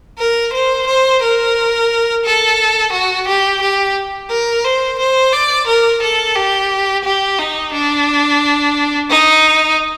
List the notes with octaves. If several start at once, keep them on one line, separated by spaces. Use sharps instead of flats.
A#4
C5
C5
A#4
A4
F#4
G4
G4
A#4
C5
C5
D5
A#4
A4
G4
G4
D#4
D4
D#4